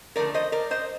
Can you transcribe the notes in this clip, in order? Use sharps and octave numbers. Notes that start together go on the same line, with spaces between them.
D3 F3 A3 A#4 D5
C5 D#5
A#4 D5
C5 D#5